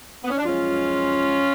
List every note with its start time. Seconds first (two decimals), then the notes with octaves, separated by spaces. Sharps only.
0.24 B3
0.30 C#4
0.37 D4
0.45 F#2 F3 G#3 C#4 F4